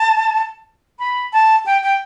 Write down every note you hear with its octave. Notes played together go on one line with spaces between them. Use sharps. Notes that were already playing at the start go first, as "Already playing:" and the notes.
Already playing: A5
B5
A5
G5
G5